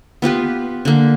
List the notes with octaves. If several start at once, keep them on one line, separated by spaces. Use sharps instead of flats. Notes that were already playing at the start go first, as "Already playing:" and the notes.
B3 F4 G4 B4
D3 A#3